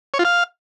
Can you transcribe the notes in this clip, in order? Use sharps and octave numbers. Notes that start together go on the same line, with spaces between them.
C#5
F4
F5